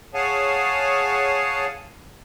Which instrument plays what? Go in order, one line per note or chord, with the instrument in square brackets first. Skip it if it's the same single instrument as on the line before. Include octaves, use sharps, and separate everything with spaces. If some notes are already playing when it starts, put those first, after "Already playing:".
[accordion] G#4 C#5 F5 F#5 G#5 A5